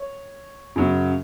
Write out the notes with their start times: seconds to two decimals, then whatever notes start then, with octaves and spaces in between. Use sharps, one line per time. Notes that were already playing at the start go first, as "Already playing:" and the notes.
Already playing: C#5
0.76 F#2 C#3 F#3